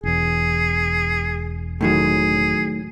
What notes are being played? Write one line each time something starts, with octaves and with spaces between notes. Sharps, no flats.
E1 E2 G#4
A2 D#3 F#3 G#4